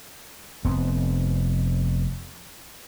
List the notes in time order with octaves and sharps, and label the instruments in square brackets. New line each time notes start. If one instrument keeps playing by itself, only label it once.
[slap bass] F1 F2 B3 C4